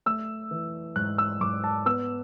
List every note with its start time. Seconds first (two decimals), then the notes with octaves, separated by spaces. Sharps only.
0.06 A3 E6
0.51 E3
0.96 G#2 F#6
1.18 E6
1.41 G#2 D6
1.64 A5
1.86 B3 E6